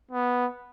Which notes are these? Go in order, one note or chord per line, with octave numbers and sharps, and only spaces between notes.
B3